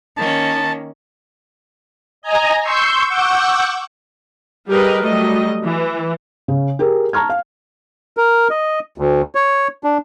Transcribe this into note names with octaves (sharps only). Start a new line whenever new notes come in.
D#3 A#3 C#4 A5
D#5 G#5 A#5
C6 C#6 E6 G6
F#5 C#6 D6 E6 G6
G3 G4 G#4 A#4 B4 D#5
F#3 G3 A3 D#5
E3
C#3
G4 G#4 A#4
A5 A#5 C#6 F6 G#6
F5
A#4
D#5
D2
C#5
D4